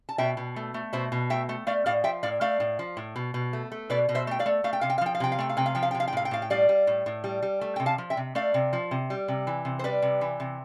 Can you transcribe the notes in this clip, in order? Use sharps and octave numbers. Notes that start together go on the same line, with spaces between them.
A5
B2 E5 G5
B2
A3
A3
B2 C5 E5
B2
A3 E5 G5
A3
A3 D5 F5
A2 D5 F5
F3 E5 G5
A2 D5 F5
A3 D5 F5
A2
F3
A2
B2
B2
A3
A3
B2 B4 D5
B2
C5 E5
A3 G5
D5 F5
A3
A3 F5
G5
C3 F5
G5
F5
F3 G5
F5
C3 G5
F5
A3 G5
F5
C3 G5
F5
F3 G5
F5
G5
C3
F5
G5
A2 F5
G5
A2 F5
G5
G3 D5 F5
G3
A2
A2
G3
G3
A3
C3 G5
F5 A5
F3
E5 G5
C3
A3 D5 F5
C3
F3
C3
G3
C3
E3
C3
C5
G3 B4 D5
C3
E3
C3